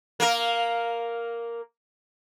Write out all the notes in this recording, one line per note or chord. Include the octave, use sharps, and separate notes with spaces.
A#3 A#4